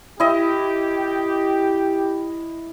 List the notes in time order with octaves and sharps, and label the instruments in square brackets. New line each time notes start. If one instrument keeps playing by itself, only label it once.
[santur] E4 D#5 [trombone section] G4